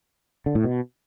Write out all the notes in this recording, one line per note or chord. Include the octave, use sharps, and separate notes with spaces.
D3
A2
B2